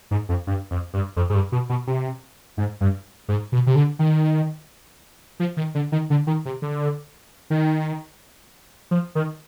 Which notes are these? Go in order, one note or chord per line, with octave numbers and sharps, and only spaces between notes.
G#2
F2
G2
F2
G2
F2
G#2
G2
B2
B2
C3
G#2
G2
G#2
B2
C3
D3
D#3
F3
D#3
D3
D#3
D3
D#3
C3
D3
D#3
F3
D#3